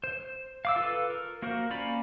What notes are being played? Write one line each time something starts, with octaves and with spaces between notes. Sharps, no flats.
C5
F5 D6 E6
F4 A4 B4
A#4
A#3 F#4 A#4 C5
A#3 C#4 F4 D5 B5